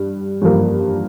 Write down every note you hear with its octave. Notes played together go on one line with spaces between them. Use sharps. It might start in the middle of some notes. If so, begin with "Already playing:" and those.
Already playing: G2
G2 F3 A#3